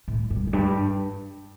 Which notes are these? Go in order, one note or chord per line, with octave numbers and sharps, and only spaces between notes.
A2
G2
F2
G2